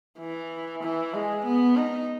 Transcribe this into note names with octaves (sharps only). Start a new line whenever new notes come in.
E3
E3
G#3
B3
D#4